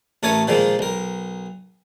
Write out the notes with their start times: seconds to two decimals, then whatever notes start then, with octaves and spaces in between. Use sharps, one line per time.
0.23 A1 A3 A4 A#4 C#5 G#5
0.48 A#2 D#3 F3 G#3 A#3
0.79 B1 A#4